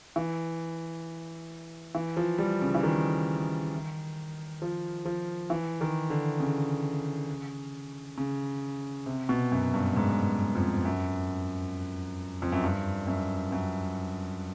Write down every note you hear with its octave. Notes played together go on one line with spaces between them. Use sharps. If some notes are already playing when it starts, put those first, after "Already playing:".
E3
E3
F3
G3
C#3
E3
D#3
F3
F3
E3
D#3
D3
C#3
C#3
C3
B2
F#2
G2
G#2
F2
F#2
F2
F#2
G2
F#2
F#2